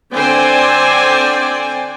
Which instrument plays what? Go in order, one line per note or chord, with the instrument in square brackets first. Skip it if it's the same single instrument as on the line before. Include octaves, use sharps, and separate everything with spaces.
[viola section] D3 C4 C5 D5 G5 G#5